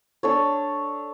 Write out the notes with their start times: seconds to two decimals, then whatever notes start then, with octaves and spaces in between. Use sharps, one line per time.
0.23 D4 A4 C#5